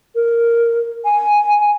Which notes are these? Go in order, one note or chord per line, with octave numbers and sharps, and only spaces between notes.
A#4
G#5